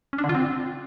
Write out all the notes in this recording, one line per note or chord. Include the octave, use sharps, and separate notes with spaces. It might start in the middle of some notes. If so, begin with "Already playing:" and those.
C#4
D4
D3
F4
C4